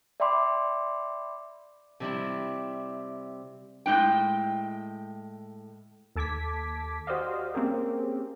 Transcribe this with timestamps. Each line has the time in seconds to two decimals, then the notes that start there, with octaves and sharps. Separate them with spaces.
0.20 D5 E5 G5 B5 C6 D6
2.00 C3 G3 E4
3.86 A2 G#3 D4 G5
6.16 D#2 A4 A5 D6 G#6 B6
7.07 F#4 G4 C5 D5 D#5 F5
7.54 A#3 C4 C#4 G4 G#4 A#4